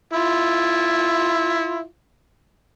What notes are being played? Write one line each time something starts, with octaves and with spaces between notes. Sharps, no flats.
E4 F4